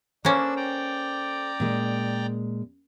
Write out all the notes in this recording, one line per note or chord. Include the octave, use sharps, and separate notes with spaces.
A#3 C#4 D4 A4 C5 E6
D5 G5 A#5
A#2 G#3